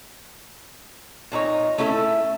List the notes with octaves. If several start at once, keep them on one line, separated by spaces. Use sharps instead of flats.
A#2 D4 D#4 C#5
A3 C#4 E4 A4 E5